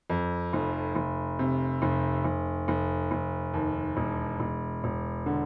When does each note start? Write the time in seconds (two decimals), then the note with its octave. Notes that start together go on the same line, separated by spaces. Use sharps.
0.10 F2
0.53 F1
0.95 F1
1.39 C3
1.82 F1
2.24 F1
2.68 F1
3.11 F1
3.54 D#2
3.97 E1
4.40 E1
4.84 E1
5.26 D3